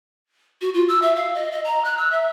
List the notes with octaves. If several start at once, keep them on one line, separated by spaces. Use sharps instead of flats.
F#4
F4
E6
E5
F5
D#5
D#5
A#5
F#6
E6
E5